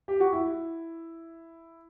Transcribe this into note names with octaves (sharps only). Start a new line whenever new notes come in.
G4
F#4
E4